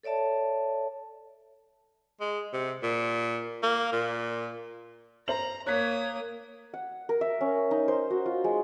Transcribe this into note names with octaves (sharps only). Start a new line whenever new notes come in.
A4 C#5 D5 E5 A5
G#3
C3
A#2
A#3
A#2
C5 A#5 F#7
A#3 C#5 D#6 F#6 B6
F#5
A#4
E5
C#4
D#4
C5
F#4
F4
G#3